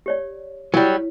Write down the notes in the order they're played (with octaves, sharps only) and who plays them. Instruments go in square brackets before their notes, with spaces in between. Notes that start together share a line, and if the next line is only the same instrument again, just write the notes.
[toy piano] G4 C#5 D5
[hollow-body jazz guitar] F#3 G3 [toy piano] E4 C#5